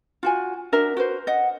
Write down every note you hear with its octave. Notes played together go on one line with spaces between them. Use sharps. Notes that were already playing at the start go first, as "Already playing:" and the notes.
F4 F#4 G#5
D4 F#4 A#4 E5
F#4 B4 C5
D#5 F#5